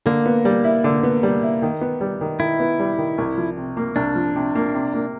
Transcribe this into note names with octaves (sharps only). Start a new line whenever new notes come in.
D3 A#3
B3
G3
E4
D3
B3
G3
E4
D#3
B3
G3
D#3
D#3 E4
B3
G3
D#3
C2
F3
C3
A#3
C2 D4
F3
C3
A#3
C3
A#3